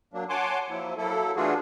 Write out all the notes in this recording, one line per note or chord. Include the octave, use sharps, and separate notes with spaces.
F#3 A#3 D4
C#5 F#5 G#5 A5 C6 D6
F3 F#3 A#3 E4
F#3 A#3 E4 A4
E3 A3 D4 F4 F#4 G#4